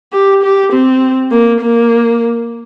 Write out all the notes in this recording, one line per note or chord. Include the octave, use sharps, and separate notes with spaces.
G4
G4
C4
A#3
A#3